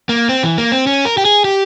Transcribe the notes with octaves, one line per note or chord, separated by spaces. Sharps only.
A#3
C4
E3
A#3
C4
C#4
A#4
G4
G#4
G4